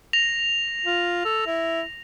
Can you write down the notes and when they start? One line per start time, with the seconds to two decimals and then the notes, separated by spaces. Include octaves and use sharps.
0.13 A#6 F7
0.85 F4
1.25 A4
1.47 E4